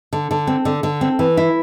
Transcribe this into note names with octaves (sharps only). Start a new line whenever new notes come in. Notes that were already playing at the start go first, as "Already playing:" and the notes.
D3
D3
C4
D3
D3
C4
E3
E4